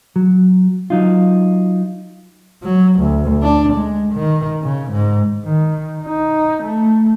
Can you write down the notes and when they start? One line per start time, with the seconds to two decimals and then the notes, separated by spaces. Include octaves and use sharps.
0.16 F#3
0.90 F#3 D#4 F4
2.63 F#3
3.00 D2
3.43 D4
3.74 G#3
4.13 D#3
4.62 C#3
4.92 G#2
5.45 D#3
6.04 D#4
6.63 A3